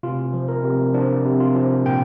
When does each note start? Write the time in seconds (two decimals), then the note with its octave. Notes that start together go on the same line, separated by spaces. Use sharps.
0.03 C3 F4
0.33 F3
0.48 A#4
0.64 C3
0.94 F3 D4
1.25 C3
1.40 F4
1.55 F3
1.85 A#2 G5